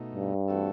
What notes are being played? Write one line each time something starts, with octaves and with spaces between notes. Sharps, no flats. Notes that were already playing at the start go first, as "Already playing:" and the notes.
Already playing: B2 A3 D#4
G2
E3 A3 C4 F#4 A4